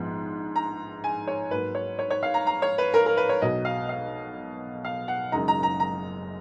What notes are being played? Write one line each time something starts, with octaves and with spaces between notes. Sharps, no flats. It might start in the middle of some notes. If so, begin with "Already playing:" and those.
Already playing: A#1 G#2 F3 G#3 B3
A#5
G#5
C#5
G#2 F#3 A#3 B4
C#5
C#5
C#5
F5
A#5
A#5
C#5
B4
A#4
A#4
B4
C#5
B1 B2 F#3 D#5
F5
F5
F5
F#5
F#1 F#2 C#3 G#3 D#4 A#5
A#5
A#5
A#5